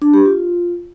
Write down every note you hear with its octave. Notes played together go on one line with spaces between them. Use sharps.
D4
G4
F4